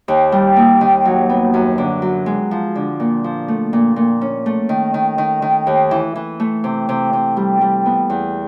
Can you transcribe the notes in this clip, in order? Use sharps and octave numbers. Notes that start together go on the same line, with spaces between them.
D#2
G3
A#3
D#3
F#3
B3
F#2
D3
F#3
G#3
F3
D3
A#2
F3
A3
A#2
A#2
C#4
A3
D#3
D#3
D#3
D#3
D#2
E3
E3
A3
C3
C3
C3
G3
G3
B3
E2